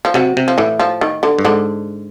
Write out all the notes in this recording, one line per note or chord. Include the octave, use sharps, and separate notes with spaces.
F3
C3 F#3
C3
F3
A2 E3
F3
D#3
D3
G2
G#2 D3